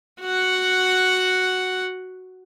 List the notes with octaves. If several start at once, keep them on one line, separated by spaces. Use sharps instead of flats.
F#4 F#5